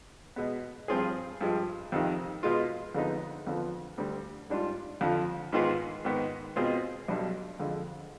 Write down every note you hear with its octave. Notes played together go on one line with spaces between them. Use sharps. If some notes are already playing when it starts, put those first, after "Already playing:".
B2 G#3 B3
G2 F3 C4 F4 G#4
G2 F3 G#3
F2 C3 D#3
B2 G#3 B3 F4
F2 D3 G#3 B3 D#4
F2 D3 F3 B3
D2 D3 G3
G#2 G3 D4 F4
F2 D3 F3
G#2 D#3 B3 F4 G#4
G#2 D#3 B3
B2 G#3 C4 F4 G#4
B1 B2 G3 D4
F2 D3 G#3